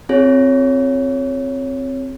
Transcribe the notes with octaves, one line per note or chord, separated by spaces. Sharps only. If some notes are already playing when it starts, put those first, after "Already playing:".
C4 F4 G#4 C#5